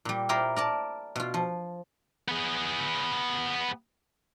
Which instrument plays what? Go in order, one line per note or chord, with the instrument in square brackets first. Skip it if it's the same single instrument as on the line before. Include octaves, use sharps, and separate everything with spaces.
[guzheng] A#2 G3
E4 F4 G4 A#4 C5
A#4 D5 A5
B2 F4
F3
[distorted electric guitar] B3 G#4